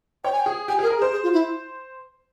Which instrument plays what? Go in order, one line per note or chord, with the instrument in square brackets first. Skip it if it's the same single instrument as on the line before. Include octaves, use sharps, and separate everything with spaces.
[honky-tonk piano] C#5 [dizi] G5
[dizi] G#5
G5
[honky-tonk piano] G#4
[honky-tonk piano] G4 [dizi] G#5
[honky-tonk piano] G#4 [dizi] A#4
[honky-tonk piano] A#4
[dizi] G#4
[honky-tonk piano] C5
[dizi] G#4
F4
E4